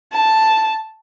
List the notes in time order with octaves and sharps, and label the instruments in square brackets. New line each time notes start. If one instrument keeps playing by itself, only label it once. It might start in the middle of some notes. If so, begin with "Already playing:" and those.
[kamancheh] A5